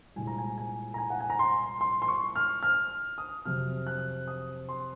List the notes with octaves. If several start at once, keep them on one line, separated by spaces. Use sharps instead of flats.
C2 A#2 G#3 G#5
A#5
G#5
G#5
A#5
G#5
F#5
G#5
A#5
C6
C6
C6
C#6
F6
F6
D#6
F2 C3 F#3 C4 F6
F#6
D#6
C6